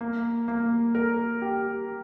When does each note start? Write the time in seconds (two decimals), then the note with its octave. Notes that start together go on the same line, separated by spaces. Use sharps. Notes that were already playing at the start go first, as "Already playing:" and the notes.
0.01 A#3
0.48 A#3
0.95 A#4
1.42 G4